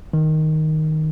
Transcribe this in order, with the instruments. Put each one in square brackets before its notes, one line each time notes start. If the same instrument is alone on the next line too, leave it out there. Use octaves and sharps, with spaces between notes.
[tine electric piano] D#3